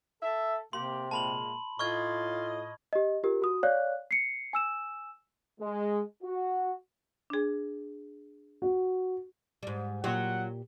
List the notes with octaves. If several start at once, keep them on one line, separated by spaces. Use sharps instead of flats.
A4 E5
C3 A#3 G4 C6
A#2 G#3 A#3 A5 B5 F#7
A2 F4 D#5 C#6 F6 G#6
G4 D#5
F4 G4 A#4
F#4 D#6
C#5 D5 F5 F#6
C7 C#7
G#5 E6 E7
G#3
F#4
D4 G#4
F#4
G#2 G3
A#2 F#3 F4 G4 F#5